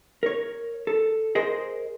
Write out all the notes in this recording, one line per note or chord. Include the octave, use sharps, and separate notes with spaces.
A#4 C#5
A4
G#4 A#4 C5 D#5